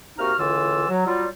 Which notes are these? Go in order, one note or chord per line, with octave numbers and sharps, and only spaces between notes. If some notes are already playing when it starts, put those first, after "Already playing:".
C3 A#3 D#4 F#4 F6
C#2 A2 D3 E3 F4 E6
F#3
F#3 G3 F4